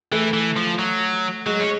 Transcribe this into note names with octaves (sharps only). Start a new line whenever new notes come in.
E3 A3
E3
F3
F#3
F#3 G#3
C#4